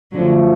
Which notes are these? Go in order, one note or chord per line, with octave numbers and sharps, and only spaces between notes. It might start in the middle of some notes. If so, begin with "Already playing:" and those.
F#2 D3 F3 F#3 A3